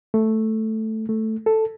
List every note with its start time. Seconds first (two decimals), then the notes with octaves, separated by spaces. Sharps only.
0.14 A3
1.09 A3
1.46 A4